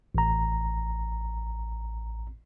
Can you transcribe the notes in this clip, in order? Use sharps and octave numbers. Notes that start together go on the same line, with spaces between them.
A1 A#5